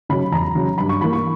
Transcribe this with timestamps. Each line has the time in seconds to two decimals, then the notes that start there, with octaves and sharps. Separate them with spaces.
0.09 C#3 F#3 B5
0.32 E2 A#5
0.55 C#3 F#3
0.78 G2 B5
0.89 C#6
1.01 E3 A#3 B5
1.13 C#6